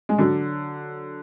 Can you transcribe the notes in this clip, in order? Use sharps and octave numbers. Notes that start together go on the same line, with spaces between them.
G#3
D3 F#3